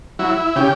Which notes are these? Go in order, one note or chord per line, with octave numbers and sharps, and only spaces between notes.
F#3 E4
C#3 G4